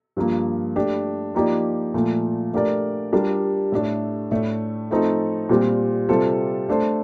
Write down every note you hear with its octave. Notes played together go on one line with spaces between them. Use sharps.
G2 F3 A#3
A3 D4 G4
F3 A#3 D#4 G4 D5
A#2 F3 A3
A3 D4 G4 A#4 D5
G3 D4 F4 A#4 D5
A2 A3 D4
A2 A3 D4 A4
F3 A3 C4 D#4 A4
A#2 G3 C4 G4
C3 G3 C4 F4 A4
A3 D4 A4 C5